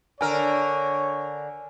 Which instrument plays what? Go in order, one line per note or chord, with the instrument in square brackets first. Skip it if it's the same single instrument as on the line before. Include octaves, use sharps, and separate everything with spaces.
[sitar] D3 A#4 [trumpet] C#5 [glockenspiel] G#5 F6